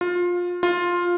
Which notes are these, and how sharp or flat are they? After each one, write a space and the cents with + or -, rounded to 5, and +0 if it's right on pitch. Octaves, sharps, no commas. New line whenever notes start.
F4 +20
F4 +10